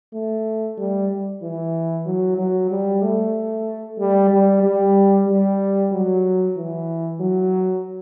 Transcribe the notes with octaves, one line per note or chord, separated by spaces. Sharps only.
A3
G3
E3
F#3
F#3
G3
A3
G3
G3
G3
G3
F#3
E3
F#3